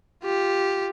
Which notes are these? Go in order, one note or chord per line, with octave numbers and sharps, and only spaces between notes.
F4 G4